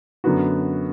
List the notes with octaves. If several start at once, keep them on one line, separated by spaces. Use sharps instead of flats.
F#2 D3 B3 F#4